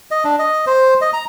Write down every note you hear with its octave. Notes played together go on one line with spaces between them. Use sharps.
D#5
D4
D#5
C5
D#5
A#5